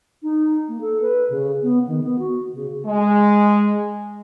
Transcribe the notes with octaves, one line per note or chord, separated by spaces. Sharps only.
D#4
A#3
A4
B4
C#3
B3
D#3
B3
F#4
C#3
G#3